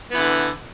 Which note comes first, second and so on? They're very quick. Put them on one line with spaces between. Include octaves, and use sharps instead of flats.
B3 E3 D3